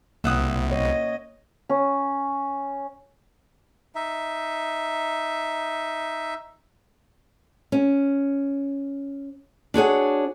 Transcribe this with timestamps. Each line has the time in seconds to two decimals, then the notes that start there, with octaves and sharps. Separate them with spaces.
0.24 C2 A#3 E5 F#5 D#6
0.72 C#5 D#5
1.69 C#4
3.95 D#4 E5
7.72 C#4
9.74 D4 F#4 G#4 C#5